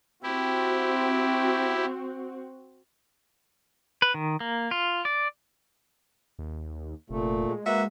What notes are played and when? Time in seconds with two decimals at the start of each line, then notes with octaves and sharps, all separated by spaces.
0.23 C4 E4 F#4 G4
4.02 B4
4.14 D#3
4.40 A#3
4.71 F4
5.05 D5
6.39 D#2
7.10 F1 A#2 A3
7.49 G#3
7.65 A#3 F#4 B4 E5